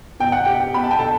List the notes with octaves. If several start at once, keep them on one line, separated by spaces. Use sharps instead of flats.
B2 G5
F#5
G4 G5
B2 B5
A5
G5
A4 A5